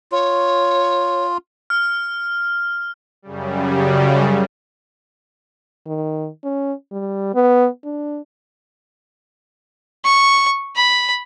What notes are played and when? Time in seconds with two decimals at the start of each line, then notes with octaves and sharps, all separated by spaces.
0.12 F4 C#5
1.70 F6
3.22 F#2 C#3 G3
5.86 D#3
6.44 C#4
6.92 G3
7.34 B3
7.84 D4
10.04 C#6
10.75 B5